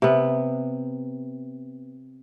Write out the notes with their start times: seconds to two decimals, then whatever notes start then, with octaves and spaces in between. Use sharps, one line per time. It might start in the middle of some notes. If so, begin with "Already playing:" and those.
0.02 C3 B3